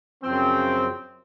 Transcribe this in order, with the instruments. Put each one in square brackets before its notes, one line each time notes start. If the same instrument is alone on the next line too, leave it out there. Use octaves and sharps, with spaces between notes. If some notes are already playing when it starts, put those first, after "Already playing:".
[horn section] F#2 C#3 F3 C4